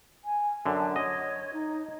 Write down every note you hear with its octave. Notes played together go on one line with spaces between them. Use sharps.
G#5
F#2 D3 A5
C#5 D#5
D#4